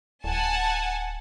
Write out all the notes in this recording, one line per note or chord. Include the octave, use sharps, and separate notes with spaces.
D1 F#5 G#5 A5